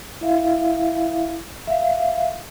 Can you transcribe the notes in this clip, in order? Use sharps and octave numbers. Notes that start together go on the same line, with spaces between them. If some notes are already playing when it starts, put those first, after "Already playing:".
E4 E5 F5
E5 F5